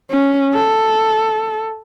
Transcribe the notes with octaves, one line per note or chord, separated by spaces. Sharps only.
C#4
A4